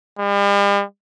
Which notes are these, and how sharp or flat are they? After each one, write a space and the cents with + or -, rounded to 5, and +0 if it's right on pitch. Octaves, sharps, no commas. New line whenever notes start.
G3 +45